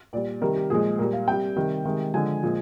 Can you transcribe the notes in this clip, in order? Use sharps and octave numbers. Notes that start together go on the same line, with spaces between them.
A#2 G3 D5
C3 D#3 G3 A#4
G4
A#2 F3 G#3 G#4
A#2 G3 A#4
F5
C3 G3 G5
C3 D#3 G3
C3 D#3 G#3
D3 F3 G#3 G#5
A#2 F3 G#3